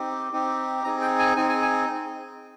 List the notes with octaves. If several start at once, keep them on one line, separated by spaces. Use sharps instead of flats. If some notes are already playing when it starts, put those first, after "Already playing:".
Already playing: C4 D#4 G4
C4 D#4 G4
C4 D#4 G#4 A#5
G5
G#5
C4 D#4 G#4 G#5
G#5
G#5